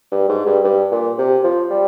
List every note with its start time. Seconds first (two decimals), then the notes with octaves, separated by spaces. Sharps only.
0.11 G2
0.29 G#2
0.46 G2
0.64 G2
0.91 A#2
1.18 C3
1.44 F3
1.71 G3